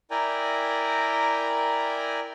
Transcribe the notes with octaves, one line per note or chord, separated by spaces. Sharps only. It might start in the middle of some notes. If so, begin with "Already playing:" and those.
E4 A#4 D5 G5 G#5 A#5